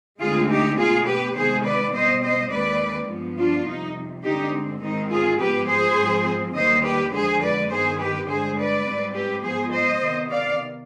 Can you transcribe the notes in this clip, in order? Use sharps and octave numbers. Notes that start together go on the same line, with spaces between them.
D2 D3 G#3 C4 F4 G#4
D#4 G4
B2 B3 F4 G#4
G4 B4
C3 D#3 G#3 B3 G#4 C5
B4 D5
B2 G3 C4 C5 D#5
C5 D#5
D#2 D#3 G#3 C4 B4 D5
G2 F3 B3
D4 F4
F2 C3 G3 D#4
G2 D3 G#3 C4 D#4 G4
G#2 D#3 G#3 C4 D#4
F4 G#4
G#2 F3 B3 G4 B4
G#4 C5
G#2 F3 C4
D#2 D#3 G3 C5 D#5
G4 B4
F2 D3 G#3 G#4 C5
B4 D5
G2 D#3 B3 G#4 C5
G4 B4
G2 D3 G#3 G#4 C5
B4 D5
G#2 G3 C4
G4 B4
G#2 F3 B3 G#4 C5
C5 D#5
C3 D#3 B3
D5 F5